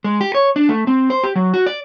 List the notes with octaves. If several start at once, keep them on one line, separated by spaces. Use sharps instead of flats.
G#3
G4
C#5
D4
A3
C4
C5
G4
F#3
F#4
D5